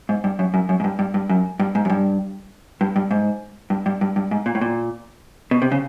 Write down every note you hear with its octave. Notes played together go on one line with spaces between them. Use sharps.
G#2
G2
F#2
F#2
F#2
G#2
G2
G2
G2
F#2
G2
G#2
F#2
G2
G2
G2
G#2
G2
G2
G2
G2
G#2
A#2
A2
A#2
B2
C3
C#3